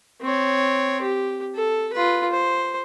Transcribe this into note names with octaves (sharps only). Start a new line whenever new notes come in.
C4 C#5
G4
A4
F4 B4
C5